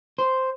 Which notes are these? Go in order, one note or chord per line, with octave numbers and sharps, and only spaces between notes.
C5